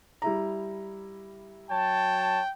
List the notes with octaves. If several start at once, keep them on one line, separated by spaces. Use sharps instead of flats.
G3 E4 A#5
F#3 C#5 G5 A5